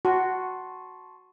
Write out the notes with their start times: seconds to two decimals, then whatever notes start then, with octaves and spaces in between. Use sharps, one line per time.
0.05 F#4 A5 C6 C#6